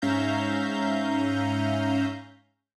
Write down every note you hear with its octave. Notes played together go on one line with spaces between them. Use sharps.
G#2 C#4 E5 F5 A#5 G6